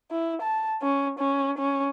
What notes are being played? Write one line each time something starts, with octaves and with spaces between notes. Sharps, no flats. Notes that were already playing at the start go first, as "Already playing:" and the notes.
E4
A5
C#4
C#4
C#4